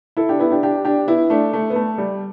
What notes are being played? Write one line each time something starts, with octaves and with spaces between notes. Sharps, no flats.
E4 A4
D4 G4
B3 E4
D4 G4
D4 G4
D4 G4
B3 E4
A3 D4
A3
B3
A3
G3